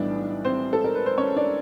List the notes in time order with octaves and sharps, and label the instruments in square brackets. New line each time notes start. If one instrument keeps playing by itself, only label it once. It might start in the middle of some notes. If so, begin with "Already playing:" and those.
Already playing: [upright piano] B1 A2 E3 G3 B3 D4 D5
C4 C5
A4
A#4
B4
C5
C#4 C#5
D4 D5